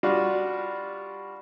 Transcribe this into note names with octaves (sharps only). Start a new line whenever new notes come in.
G3 D4 F4 F#4